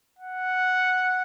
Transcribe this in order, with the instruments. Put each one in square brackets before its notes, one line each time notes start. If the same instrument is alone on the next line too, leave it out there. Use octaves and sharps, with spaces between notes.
[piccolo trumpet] F#5